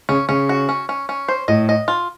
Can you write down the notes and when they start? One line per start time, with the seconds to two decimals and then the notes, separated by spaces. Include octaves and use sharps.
0.09 C#3 C#4
0.29 C#3 C#4
0.49 F#4
0.69 C#4
0.89 C#4
1.09 C#4
1.28 C5
1.48 A2 D#5
1.69 D#5
1.88 F4